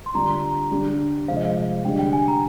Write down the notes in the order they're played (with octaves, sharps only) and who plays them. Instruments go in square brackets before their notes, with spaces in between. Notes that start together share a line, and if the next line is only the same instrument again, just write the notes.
[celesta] C6
[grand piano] D3 G3 D4 F4 [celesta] A#5
[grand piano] D3 G3 D4 G4
[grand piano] C3 F3 G#3 C4 [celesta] F5
[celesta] D#5
F5
[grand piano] D3 G3 D4 [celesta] G5
[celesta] G5
G#5
A#5